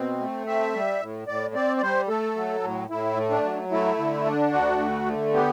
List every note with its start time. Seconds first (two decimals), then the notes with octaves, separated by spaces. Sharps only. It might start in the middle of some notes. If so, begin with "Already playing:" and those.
Already playing: B2 C4
0.20 A3
0.47 C4 E5
0.74 G3
1.01 A2
1.28 A2 D5
1.54 C4 D5
1.77 D5
1.82 G3 C5
2.09 A3 A4
2.36 F#3
2.63 A2
2.90 A2 E4
3.17 A3
3.30 D4
3.44 F#3
3.72 A3 E4
3.98 D3
4.25 D4
4.53 D2 F#4
4.79 A3
5.06 D3
5.34 B3 G4